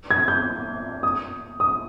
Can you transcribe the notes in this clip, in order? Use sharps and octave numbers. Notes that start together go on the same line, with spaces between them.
G#6
G6
D#6
D#6